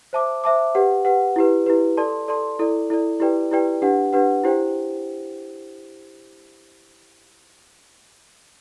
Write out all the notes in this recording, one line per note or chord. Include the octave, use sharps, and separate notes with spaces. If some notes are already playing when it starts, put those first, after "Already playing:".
C5 E5 A5 D6
C5 E5 A5 D6
G4 B4 F#5
G4 B4 F#5
E4 G4 B4
E4 G4 B4
A4 D5 A5 C6
A4 D5 A5 C6
E4 A4 D5
E4 A4 D5
E4 G4 B4 D5 G5
E4 G4 B4 D5 G5
D4 G4 B4 F#5
D4 G4 B4 F#5
E4 G4 C5 G5